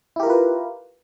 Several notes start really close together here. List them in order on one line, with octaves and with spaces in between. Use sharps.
E4 G4 A#4 F4 B4